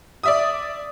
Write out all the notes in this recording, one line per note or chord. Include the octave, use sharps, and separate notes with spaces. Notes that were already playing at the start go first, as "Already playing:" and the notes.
D5 E5 D#6